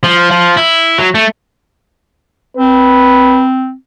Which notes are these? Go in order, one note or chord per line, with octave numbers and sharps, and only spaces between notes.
F3
F3
E4
F#3
A3
C4 B4